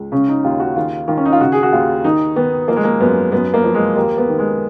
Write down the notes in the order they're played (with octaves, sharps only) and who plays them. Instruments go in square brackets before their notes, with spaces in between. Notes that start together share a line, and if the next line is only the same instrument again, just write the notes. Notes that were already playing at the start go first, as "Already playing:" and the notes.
Already playing: [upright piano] C#2
C#3 C#4
D#4
D#2 F4
F#4
D#3 F4
D#3 F4
C#4
D#4
F4
C#3 F#4
G#4
F#4
D#2 F4
D#3 D#4
D#3 B3
F3 A#3
G#3
A#3
F#2 B3
F#2 B3
A#3
F3
G#3
D#2 A#3
B3
D#3
G#3